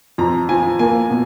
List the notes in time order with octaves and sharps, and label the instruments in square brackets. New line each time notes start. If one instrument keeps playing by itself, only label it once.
[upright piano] F2 A#5
F3 G#5
A#3 G#5
B2